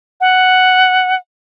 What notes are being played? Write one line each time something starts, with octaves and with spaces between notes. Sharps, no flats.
F#5